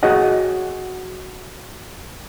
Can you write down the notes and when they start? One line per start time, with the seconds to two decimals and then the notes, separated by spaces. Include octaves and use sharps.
0.03 F#4 G#4 C#5 D#5 F#5